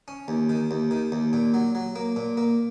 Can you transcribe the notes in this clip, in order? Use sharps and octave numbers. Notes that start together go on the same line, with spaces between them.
C#4
D#2
D#3
D#2
D#3
D#2
A#2
F#3
F#3
A#3
A#2
A#3